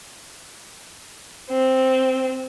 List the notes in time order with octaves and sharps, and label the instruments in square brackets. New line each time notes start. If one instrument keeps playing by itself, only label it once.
[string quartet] C4